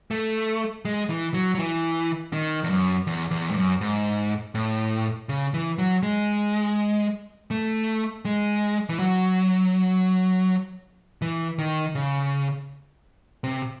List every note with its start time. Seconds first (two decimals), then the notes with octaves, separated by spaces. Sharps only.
0.11 A3
0.85 G#3
1.10 E3
1.34 F#3
1.55 F#3
1.59 E3
2.33 D#3
2.64 E2
2.70 F#2
3.07 E2
3.31 E2
3.51 G#2
3.56 F#2
3.81 G#2
4.55 A2
5.29 C#3
5.54 E3
5.78 F#3
6.03 G#3
7.51 A3
8.25 G#3
8.89 E3
8.99 F#3
11.22 E3
11.59 D#3
11.95 C#3
13.44 C3